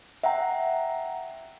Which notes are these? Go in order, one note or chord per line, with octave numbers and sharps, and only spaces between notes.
E5 F#5 G5 A#5